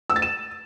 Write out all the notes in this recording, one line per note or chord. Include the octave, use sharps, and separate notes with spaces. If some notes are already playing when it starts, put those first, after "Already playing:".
E6
A6
E7